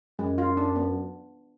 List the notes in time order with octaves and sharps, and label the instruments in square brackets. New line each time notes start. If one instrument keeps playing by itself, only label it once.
[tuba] F#2 [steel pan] G#3
[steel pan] F4
D4
B3